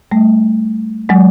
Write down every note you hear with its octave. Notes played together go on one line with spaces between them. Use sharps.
G3 A3
F#3 G#3